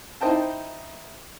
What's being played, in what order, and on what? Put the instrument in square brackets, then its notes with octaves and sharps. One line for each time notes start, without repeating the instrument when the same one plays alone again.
[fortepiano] D#4 E4 C5 D#5 G5 A5